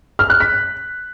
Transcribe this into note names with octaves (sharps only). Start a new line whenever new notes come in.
F6
F#6
B6